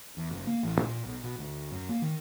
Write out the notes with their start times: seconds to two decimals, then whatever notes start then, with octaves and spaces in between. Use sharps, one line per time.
0.17 E2
0.31 F#1
0.47 A#3
0.63 A1
0.81 A#2
1.05 B1
1.23 B2
1.39 D2
1.72 F#2
1.89 A#3
2.02 D#3